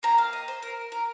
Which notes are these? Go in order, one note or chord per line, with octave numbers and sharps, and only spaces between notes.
A#3 G4 A#5
F5
D#5
C5
A#4
A#4